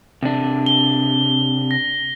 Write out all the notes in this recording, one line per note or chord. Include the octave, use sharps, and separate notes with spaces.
C3 D4
G7
A#6